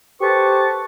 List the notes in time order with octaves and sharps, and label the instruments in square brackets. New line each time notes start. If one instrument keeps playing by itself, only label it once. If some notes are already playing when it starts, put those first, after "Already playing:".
[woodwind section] G4 A4 B4 C5 A5 C#6